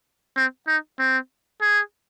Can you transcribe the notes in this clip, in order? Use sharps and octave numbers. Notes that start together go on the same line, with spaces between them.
C4
D#4
C4
G#4